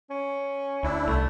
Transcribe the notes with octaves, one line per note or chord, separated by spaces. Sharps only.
C#4
D2 D4 E4
C2 A3